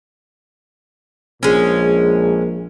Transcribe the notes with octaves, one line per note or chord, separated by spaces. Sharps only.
A#1 A#2 G#3 A#3 C#4